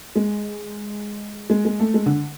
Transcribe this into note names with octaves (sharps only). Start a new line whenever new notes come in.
G#3
G#3
G#3
A3
G#3
D3